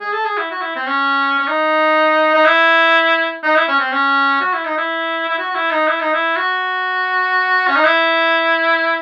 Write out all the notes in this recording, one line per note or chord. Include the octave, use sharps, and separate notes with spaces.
G#4
A4
G#4
E4
F#4
E4
C4
C#4
C#4
D#4
D#4
E4
D#4
E4
C#4
C4
C#4
F#4
E4
D#4
E4
E4
F#4
F#4
E4
D#4
E4
D#4
E4
F#4
C#4
D#4
E4